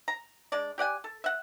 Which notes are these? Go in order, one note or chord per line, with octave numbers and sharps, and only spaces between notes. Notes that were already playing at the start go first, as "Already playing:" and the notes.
A#5
G#3 D4 D5
G4 D5 F#5 G#5
A4
E5 F#5